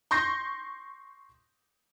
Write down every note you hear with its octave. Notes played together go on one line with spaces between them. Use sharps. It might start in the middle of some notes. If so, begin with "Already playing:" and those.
C6 C#6 G6 A#6 C7